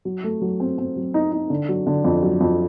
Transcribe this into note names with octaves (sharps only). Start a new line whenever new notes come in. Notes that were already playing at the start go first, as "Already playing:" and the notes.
F#3
A3
F#3
C4
C4
F#3
D#4
D#4
D3
F#3
D3
F2
F#3
F2